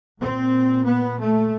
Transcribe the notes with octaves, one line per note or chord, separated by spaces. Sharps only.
A#2 C4
B3
A3